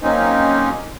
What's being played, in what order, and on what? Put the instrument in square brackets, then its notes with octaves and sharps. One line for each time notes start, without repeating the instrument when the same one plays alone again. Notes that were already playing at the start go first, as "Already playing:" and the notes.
[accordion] F#3 A#3 C4 C#4 D#4